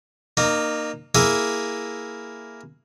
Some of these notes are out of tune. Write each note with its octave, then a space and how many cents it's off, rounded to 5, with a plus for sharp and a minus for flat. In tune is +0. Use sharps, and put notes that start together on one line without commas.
A#3 +0 D#4 -30
A#3 +0 E4 +0 G#4 +0